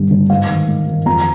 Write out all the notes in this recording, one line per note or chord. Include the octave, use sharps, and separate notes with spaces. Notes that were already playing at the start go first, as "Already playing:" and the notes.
Already playing: G2 D3
D3
G#2 F5
D#3
G#2
D#3
F2 A#5